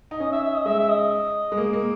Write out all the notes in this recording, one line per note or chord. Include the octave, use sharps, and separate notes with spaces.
D#4
C#4 D#5
E5
E5
D#5
G#3 E5
E5
D#5
G#3
A#3
A#3